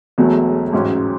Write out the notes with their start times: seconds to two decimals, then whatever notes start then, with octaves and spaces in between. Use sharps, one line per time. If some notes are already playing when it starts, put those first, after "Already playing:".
0.18 E1 E2 B2 F#3 A3
0.73 A1 G#2 F#3 C#4